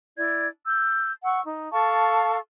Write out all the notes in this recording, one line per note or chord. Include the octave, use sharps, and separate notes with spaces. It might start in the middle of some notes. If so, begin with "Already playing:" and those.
E4 D5 G#6
E6 G6
F#5 C#6 E6
D#4
A4 F5 A5 C#6